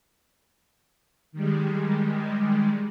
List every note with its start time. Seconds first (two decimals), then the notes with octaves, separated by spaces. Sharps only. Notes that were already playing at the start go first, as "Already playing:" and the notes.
1.32 D#3 G3 G#3